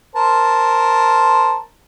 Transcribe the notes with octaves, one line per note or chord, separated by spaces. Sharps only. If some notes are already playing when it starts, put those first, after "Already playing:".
A#4 C5 A5